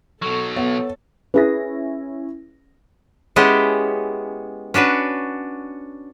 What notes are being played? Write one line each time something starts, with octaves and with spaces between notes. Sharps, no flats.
B2 F#3 A4 C#6
B3 C#5
C#4 E4 G#4 B4 A#6
G#3 B3 C#4 E4 G4
C#4 D4 F#4 B4